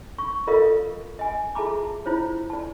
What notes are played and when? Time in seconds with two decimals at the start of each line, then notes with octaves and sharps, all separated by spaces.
0.18 C#6
0.47 F4 A4 A#4 D5 D#5 F5
1.19 D#5 G#5
1.55 F4 G#4 E5 A5 A#5 D6
2.06 E4 F4 C5 C#5
2.50 D5 A5